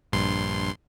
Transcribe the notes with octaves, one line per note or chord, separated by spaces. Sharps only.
A#1 G2 C6